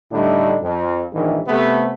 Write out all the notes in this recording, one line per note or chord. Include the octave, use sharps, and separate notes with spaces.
A2 D3 G3 A3 D4 D#4
F2
A#1 G#2 D#3 E3
C3 A3 B3